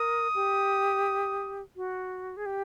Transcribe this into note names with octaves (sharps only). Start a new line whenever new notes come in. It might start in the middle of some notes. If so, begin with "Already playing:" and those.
Already playing: A#4 D#6
G4
F#4
G#4
G4